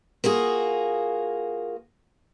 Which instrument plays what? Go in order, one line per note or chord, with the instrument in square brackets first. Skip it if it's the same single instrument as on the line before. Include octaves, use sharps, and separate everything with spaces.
[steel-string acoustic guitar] A#3 F4 F#4 G#4